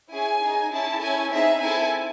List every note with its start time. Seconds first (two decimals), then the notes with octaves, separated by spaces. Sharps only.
0.11 C#4 E4 G#4 G#5
0.41 D#4 G#4
0.72 C#4 E4 G#4 A5
1.01 C#4 E4 A4 G#5
1.32 C4 D#4 G#4 E5
1.61 C4 E4 A4 G#5